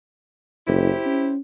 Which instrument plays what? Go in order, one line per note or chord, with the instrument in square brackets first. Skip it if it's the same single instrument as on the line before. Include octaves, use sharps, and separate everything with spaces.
[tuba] F#1 [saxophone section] E4 G4 C5
[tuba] C#4